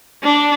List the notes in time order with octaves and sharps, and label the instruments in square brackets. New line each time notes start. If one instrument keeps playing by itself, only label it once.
[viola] D4